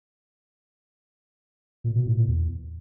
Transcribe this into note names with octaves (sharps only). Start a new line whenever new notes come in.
A#2
B2
A2
A#2
E2